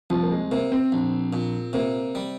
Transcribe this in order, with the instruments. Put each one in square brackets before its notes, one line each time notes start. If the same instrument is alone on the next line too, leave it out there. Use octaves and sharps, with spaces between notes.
[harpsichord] C2 [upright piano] F3
[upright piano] A#3
G#3
[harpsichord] C3 [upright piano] A#3
[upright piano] C4
[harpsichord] A#1
A#2
[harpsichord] C3 [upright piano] A#3
[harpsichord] G3